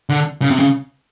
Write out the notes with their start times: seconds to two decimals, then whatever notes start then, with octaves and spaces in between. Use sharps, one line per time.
0.09 D3
0.42 C#3
0.51 C3
0.60 C#3